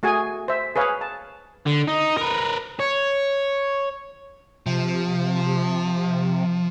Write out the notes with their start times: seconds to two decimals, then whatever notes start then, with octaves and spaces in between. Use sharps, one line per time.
0.03 A3 F#4 G#4 G#5
0.48 C5 E5
0.76 G#4 B4 C#5 F5
1.01 A5
1.66 D3
1.87 D#4
2.17 A#4 B4
2.80 C#5
4.66 C3 F3